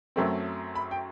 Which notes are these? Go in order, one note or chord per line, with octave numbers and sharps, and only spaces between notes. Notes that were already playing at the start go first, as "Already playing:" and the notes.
F#2 F#3 A3 C4
B5
G5